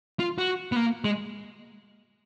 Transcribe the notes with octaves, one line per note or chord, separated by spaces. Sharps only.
F4
F#4
B3
A#3
G#3